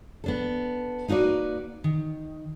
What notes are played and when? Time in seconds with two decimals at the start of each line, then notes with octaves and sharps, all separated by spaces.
0.24 B3 D4 A4
1.08 A#3 D#4 F#4 B4 D5
1.84 D#3